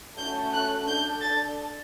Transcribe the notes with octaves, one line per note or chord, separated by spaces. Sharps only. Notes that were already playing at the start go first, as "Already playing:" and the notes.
A3 C#4 F#4 A4 G6
F#6
D4 A4 G6
A6